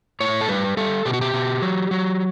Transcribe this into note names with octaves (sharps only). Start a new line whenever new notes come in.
A2 C#5
A4
G3 B4
G3 A4
B2 G4
F#4
G4
B2
F#3
F#3